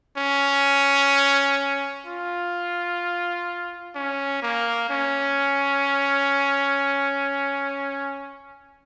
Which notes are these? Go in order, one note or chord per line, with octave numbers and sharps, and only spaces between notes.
C#4
F4
C#4
A#3
C#4